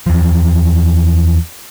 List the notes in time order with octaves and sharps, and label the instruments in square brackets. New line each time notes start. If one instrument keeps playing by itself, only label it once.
[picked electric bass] E2 F3